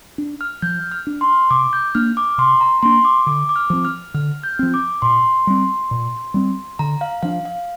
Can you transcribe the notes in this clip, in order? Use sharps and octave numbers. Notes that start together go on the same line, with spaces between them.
D4
F6
F3 G6
F6
D4
C6
C3 D6
G6
A#3 D4 F6
D6
C3 C6
A#5
A#3 D4 C6
D6
D3 D6
D6
F6
F3 C4
F6
D3 F6
G6
F3 C4
D6
A#2 C6
G3 C4
A#2
G3 C4
D3 A#5
F5
F3 D4 F5
F5